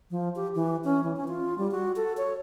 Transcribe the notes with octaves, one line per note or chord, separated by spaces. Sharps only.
F3
G4
E3
C#4
E3
C#4
F4
G3
F#4
A4
C#5